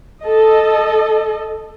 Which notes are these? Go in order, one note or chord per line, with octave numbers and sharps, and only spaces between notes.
A4 D#5